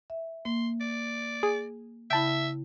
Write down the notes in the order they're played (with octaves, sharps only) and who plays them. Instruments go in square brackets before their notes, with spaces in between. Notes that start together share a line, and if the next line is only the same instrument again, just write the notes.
[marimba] E5
[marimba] A#3 [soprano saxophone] C6
[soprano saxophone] D5
[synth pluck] G#4
[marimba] C#3 E4 [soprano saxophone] E5 [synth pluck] G5 A5 B5